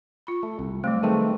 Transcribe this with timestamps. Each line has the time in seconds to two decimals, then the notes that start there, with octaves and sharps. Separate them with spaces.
0.27 F4 B5
0.43 A3
0.59 C2
0.84 F#3 G3 A3 C4
1.03 D#3 A3 C4 G#4 B4